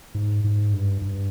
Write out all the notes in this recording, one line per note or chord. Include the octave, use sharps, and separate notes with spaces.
G#2
G#2
G2
G2